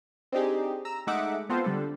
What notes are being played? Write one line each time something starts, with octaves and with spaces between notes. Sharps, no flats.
C4 D4 D#4 G4 G#4
A#5 E6
G#3 A3 D#4 E5 F#5 D6
B3 C4 F4 A4 C5
D3 G3 D4 A4